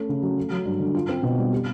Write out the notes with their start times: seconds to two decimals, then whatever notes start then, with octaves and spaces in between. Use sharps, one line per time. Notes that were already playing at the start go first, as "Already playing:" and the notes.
Already playing: A3 C#4
0.09 C#3
0.22 F#3
0.37 A3
0.51 F#3
0.65 G2
0.80 D3
0.95 F4
1.09 C4
1.23 B2
1.38 G3
1.53 G4